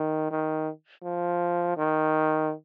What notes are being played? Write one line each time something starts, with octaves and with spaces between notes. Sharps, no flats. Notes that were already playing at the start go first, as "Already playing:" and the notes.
Already playing: D#3
D#3
F3
D#3